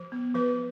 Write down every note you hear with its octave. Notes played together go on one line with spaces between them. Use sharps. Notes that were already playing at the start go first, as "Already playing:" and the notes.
Already playing: F3
B3
F3 B4